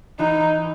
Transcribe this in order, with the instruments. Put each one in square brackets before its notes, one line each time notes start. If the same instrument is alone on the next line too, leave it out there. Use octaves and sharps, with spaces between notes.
[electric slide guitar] E3 [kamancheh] D#4